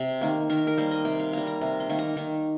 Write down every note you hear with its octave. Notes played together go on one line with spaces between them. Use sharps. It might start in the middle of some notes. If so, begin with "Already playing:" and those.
Already playing: C3
D#3 A#3
D#3 A#4
A#4
G3 A#3 C5
D#5
C3 G5
F5
G3 A#3 A#5
A#5
C3 A#5
C6
D#3 A#3
A#5
D#3